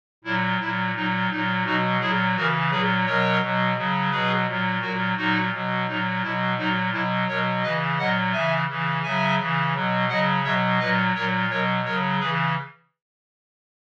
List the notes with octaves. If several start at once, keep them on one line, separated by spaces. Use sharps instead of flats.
A#2 F#3 E4
A#2 F#3 E4
A#2 F#3 D#4
A#2 F#3 D#4
B2 F#3 D#4 F#4
A#2 F#3 E4 G#4
C#3 E3 F#4 A#4
A#2 F#3 G#4 B4
B2 F#3 A#4 C#5
B2 F#3
C#3 F#3
B2 F#3 G#4 B4
A#2 F#3
A#2 F#3 F#4 A#4
A#2 F#3 D#4 F#4
B2 F#3
A#2 F#3 D#4
B2 F#3 E4
A#2 F#3 D#4 F#4
B2 F#3 E4
B2 F#3 A#4 C#5
C#3 E3 B4 D#5
A#2 F#3 D#5 F#5
C#3 E3 E5 G#5
C#3 E3
C#3 F#3 E5 G#5
C#3 E3
B2 F#3
C#3 F#3 D#5 F#5
B2 F#3 C#5 E5
A#2 F#3 B4 D#5
A#2 F#3 A#4 C#5
B2 F#3 A#4 C#5
C#3 F#3 A#4 C#5
C#3 E3 G#4 B4